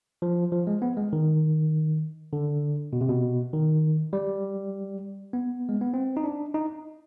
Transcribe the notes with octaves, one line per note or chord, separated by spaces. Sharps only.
F3
F3
G#3
B3
G#3
D#3
D3
B2
C3
B2
D#3
G3
B3
G#3
B3
C4
D#4
D4
D#4